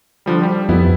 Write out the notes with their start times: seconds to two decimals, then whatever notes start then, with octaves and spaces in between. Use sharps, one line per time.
0.26 D3 F3 G3
0.43 G3
0.69 F2 B3 E4